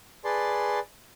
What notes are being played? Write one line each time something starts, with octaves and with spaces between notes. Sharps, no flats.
G#4 B4 D5 A5 C6